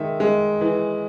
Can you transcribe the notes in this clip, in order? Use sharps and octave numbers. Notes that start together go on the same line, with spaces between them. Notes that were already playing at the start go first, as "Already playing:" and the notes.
Already playing: D#3 G#3 E5
G#3
E3